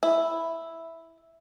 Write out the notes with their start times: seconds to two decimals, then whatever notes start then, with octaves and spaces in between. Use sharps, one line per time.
0.03 E4